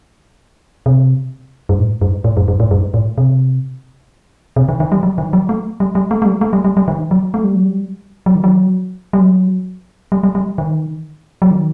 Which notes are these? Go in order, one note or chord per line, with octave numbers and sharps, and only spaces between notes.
C3
G2
A2
G2
A2
G2
G2
A2
G2
A2
C3
C3
D#3
D#3
G3
F#3
D#3
F#3
A3
G3
G3
A3
A3
G3
A3
G3
G3
G3
D#3
F#3
A3
G3
F#3
G3
F#3
D#3
F#3
G3
F#3
G3
G3
G3
D#3
F#3
D#3